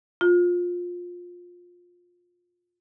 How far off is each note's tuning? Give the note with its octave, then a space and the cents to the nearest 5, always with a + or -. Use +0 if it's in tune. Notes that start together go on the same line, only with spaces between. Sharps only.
F4 +20